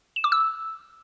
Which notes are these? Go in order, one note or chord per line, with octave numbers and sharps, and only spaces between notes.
E7
D6
E6